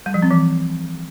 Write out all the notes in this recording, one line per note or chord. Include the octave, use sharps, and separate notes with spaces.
G3
F3
C4
E3